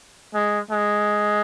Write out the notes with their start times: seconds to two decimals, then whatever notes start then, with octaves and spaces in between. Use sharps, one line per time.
0.34 G#3
0.70 G#3